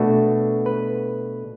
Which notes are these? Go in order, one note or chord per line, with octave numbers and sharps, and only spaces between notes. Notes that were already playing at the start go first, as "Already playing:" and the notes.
Already playing: B2 A3 D4 F#4
B4